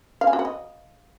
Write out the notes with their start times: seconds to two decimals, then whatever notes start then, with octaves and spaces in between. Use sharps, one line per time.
0.21 F5
0.27 G#5
0.33 F#4
0.39 F#5
0.45 D#5